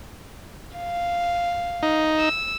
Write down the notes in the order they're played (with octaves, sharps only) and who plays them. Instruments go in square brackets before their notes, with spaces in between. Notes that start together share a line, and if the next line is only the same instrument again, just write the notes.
[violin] F5
[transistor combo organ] D#4
[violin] E6